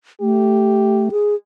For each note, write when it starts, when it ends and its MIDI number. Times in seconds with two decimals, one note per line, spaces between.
0.21 1.09 57
0.21 1.12 67
1.12 1.35 68